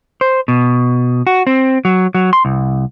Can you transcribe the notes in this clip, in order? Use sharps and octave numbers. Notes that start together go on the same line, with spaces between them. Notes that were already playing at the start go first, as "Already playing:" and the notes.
C5
B2
F#4
C4
F#3
F#3
C6
C2